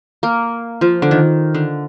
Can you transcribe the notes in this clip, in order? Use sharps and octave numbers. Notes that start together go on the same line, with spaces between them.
A#3
F3
D3
D#3
D3